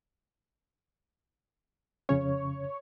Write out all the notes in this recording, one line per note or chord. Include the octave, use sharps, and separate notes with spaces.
F2 C#3 C#4 C#5